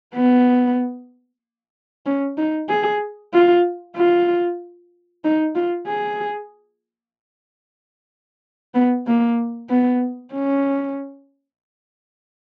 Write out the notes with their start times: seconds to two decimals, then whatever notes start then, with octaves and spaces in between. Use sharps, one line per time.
0.15 B3
2.06 C#4
2.38 D#4
2.69 G#4
3.33 F4
3.96 F4
5.24 D#4
5.55 F4
5.87 G#4
8.74 B3
9.07 A#3
9.69 B3
10.33 C#4